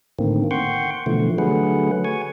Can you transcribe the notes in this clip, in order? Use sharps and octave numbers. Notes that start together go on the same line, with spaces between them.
A2 D3 D#3 A#3 C4
F#5 G5 C6 C#6
B2 D3 E3 F3 A3
D3 F#3 A3 G#4 B4 F#5
G#5 C#6